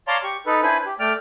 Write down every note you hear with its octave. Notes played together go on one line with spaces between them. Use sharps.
C#5 D5 F5 A5 A#5 C6
G4 C#6
D#4 A4 B4
D4 E4 B4 C5 G#5 B5
G4
A3 D5 G5 F6